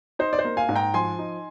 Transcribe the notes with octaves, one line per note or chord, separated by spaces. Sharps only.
D#4 C5
D5
C5
A#3
F5 G#5
G#2
G5 A#5
F3 G#5 C6
D#4